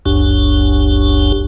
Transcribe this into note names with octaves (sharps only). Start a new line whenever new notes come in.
F#1 C#2 F#2 D4 G4